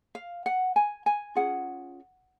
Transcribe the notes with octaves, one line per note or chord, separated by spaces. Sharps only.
F5
F#5
G#5
G#5
C#4 F4 G#4 F#5